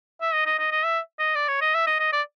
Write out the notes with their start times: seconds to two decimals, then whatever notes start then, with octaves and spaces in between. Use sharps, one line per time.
0.21 E5
0.33 D#5
0.46 D#5
0.59 D#5
0.71 D#5
0.84 E5
1.19 D#5
1.35 D5
1.48 C#5
1.61 D#5
1.75 E5
1.87 D#5
2.00 D#5
2.13 D5